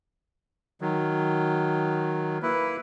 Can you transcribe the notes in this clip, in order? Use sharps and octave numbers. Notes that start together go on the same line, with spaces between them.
D#3 F#3
A#3 E4 B4